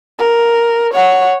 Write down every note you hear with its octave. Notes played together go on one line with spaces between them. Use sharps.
A#4
C#5 F#5